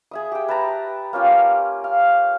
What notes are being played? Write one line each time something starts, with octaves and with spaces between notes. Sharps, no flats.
G#4 E5 D#6
G4 G5
B4 A5 A#5
A#3 C#4 F4 G4
F5